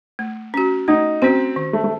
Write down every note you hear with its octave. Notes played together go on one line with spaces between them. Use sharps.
A3
C#4 F#4
A3 D#4
C4 C#4 F#4
D#3
A3
A3